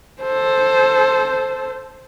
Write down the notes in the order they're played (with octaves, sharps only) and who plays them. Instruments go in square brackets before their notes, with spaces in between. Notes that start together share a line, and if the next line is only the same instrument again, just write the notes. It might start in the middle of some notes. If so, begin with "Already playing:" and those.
[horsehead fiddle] A4 C5